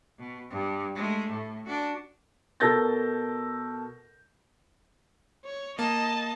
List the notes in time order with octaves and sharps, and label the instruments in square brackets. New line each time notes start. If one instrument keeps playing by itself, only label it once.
[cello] B2
G2
G#3 A3
A2
D4 F#4
[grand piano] B2 A4 A#4 G6 A6 A#6
[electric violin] C#5
[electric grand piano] A#3 [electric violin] D#5 A5